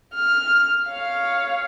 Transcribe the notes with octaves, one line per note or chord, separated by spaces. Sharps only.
F6
C#5 F5